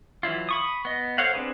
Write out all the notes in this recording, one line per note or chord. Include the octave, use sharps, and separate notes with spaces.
E3 F#3 E4 F4
B5 C#6 D#6
B3 D#5
A4 C5 C#5 F5 F#5
C4 D4 G#4 B4